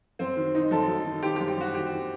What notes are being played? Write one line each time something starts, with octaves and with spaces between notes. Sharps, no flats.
F#2 C4
D#3
D#3 D#4
F#2 A4
F#2
D#3
D#3 G4
G4
F#2
G4
F#2 F#4
D#3 G4
D#3